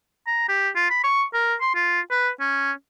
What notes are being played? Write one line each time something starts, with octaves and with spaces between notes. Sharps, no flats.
A#5
G4
F4
B5
C#6
A#4
C6
F4
B4
C#4